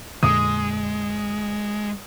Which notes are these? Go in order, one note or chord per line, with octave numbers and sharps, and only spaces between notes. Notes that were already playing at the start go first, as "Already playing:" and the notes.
F2 A#2 D3 G#3 D#6